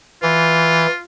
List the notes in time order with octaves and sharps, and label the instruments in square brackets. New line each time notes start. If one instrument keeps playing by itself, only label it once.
[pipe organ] E3 [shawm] F4